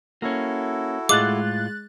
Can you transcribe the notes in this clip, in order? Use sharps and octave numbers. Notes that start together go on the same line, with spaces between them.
A#3 C#4 E4 F#4 A4
A2 G#3 F4 D6 F#6 A6